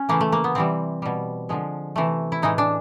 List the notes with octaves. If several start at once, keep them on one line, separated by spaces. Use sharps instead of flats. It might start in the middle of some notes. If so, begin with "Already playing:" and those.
Already playing: C#4
C#3 E3 A3 A#3
A3
A#3
B3
C3 E3 G3 C4
B2 G3
D3 F3 G#3
C3 E3 A3
E4
A2 E3 G#3 D#4
D4